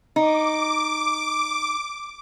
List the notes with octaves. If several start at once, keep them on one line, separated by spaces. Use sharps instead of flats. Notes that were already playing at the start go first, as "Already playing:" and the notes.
D#4 D6